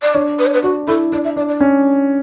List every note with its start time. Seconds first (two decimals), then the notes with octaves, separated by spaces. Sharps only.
0.02 D5
0.14 D4 C#5
0.39 B4
0.46 C#5
0.53 B4
0.63 D4 F#4
0.87 E4 A4
1.12 D4 D5
1.24 E5
1.36 D4 D5
1.49 D5
1.61 C#4